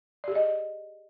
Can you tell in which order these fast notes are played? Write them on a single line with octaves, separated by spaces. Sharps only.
D5 G4 G#4 D#5